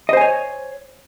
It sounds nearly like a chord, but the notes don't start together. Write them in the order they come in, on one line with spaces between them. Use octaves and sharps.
D#5 C5 G#5 C#5